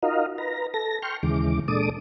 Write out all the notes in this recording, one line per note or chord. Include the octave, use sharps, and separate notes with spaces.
D#4 F4 F#4 A#4 D#5 F5
B4 A#5
A4 A#6
G5 C6 C#6 F6
D#2 C#3 E3 G#3 D6
A#2 G#3 D4 A4 D6 D#6